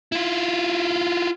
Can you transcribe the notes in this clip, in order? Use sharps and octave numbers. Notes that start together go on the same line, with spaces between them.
E4 F4